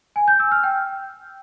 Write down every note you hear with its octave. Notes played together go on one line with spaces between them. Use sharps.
G#5
G6
E6
F6
G5